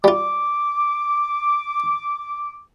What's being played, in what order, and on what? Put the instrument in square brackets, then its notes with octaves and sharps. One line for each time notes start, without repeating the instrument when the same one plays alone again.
[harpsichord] G3 F4 [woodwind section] D6